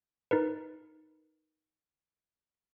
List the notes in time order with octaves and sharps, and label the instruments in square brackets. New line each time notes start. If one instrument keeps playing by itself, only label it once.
[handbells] D#4 A#4 B4